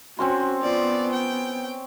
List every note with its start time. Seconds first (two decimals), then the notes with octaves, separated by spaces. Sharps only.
0.19 C4 C#4 F#4 C6
0.62 F3 B3 D5
1.13 G5